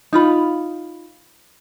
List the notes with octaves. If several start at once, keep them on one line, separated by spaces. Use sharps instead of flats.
D#4 F4 B5